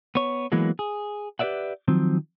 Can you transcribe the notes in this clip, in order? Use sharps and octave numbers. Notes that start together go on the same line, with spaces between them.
B3 C#5
E3 F#3 G#3 A#3 B3
G#4
G4 B4 C#5 D5 E5 F#5
D#3 F3 F#3 C4